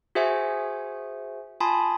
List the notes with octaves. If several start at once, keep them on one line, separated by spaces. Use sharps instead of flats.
F#4 G#4 C5 E5 F#5 G#5
F4 G#5 A5 B5 C6 D#6